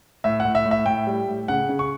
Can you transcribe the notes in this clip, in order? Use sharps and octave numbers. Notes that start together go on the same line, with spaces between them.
A2 E5
F#5
A2
E5
A2
E5
A2 G5
G3
A2
C#3 F#5
C#3
C#6